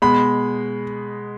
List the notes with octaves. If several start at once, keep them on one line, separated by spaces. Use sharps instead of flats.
B2 G#3 B5